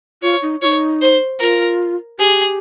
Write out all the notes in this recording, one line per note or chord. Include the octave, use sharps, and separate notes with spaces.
F4 C#5
D#4
D#4 F4 C#5
C5
F4 A#4
G4 G#4